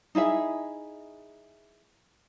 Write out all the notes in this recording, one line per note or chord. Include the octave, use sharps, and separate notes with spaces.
D#4 E4 G#4 E5